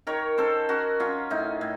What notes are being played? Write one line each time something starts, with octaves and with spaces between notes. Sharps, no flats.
D#3 A#4 C#5
C#4 A4 C5
C#4 F#4 A#4
F#3 C#4 F4
A2 D#4
A2